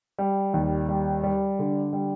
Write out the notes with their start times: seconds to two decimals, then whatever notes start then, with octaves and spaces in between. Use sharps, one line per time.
0.18 G3
0.54 D#2
0.89 G3
1.24 G3
1.59 D3
1.93 G3